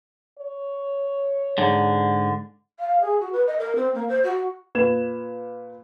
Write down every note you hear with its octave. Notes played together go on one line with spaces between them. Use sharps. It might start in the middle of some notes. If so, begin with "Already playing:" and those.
C#5
G#2 D3
F5
G#4
F#4
B4
D#5
A#4
C4
A#3
C5
F#4
A#2 B4 G#6 E7